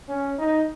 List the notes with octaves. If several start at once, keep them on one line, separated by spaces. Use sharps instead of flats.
C#4
D#4